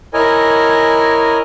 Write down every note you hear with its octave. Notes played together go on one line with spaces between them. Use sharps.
E4 A#4 C#5 D#5 G#5